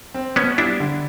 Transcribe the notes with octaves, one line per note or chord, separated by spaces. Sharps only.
C4
B2 B3 C#4
G3 D4 E4
D3